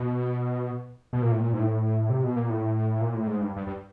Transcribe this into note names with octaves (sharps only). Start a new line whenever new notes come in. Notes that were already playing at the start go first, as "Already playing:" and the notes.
Already playing: B2
B2
A#2
A2
A#2
G#2
A2
C3
B2
A#2
A2
A#2
A2
G#2
G2
G2
G2